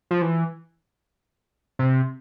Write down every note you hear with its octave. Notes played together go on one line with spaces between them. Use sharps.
F3
E3
C3